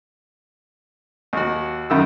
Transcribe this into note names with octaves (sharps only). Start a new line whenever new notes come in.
D#2 F#4
F#2 D#3 E6